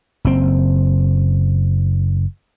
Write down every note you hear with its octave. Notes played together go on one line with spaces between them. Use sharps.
F#1 C4